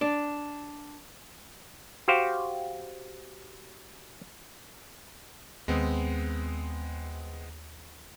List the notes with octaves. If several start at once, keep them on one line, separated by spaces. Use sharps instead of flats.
D4
F#4 G4 C5 F5
D#2 G#3 B3 C4